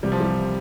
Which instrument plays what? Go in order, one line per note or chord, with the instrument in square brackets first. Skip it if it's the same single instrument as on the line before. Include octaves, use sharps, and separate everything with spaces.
[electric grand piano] C2 C3 E3 [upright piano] G3
[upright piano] F3
G3